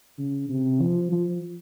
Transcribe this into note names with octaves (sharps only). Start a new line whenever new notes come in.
C#3
C3
F3
F3